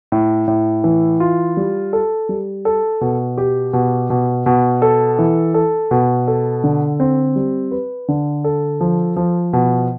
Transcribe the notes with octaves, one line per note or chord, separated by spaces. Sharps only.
A2
A2
E3
F4
G3
A4
G3
A4
B2
G4
B2
B2
B2
A4
E3
A4
B2
A4
D3
C4
G3
B4
D3
A4
F3
F3
B2